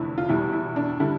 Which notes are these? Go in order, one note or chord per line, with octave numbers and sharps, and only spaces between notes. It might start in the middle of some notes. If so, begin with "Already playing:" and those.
Already playing: F1 E2 D3 F3 A3 E4
F4
E2 B2 G3 E4
E4
D4
D3 G3 E4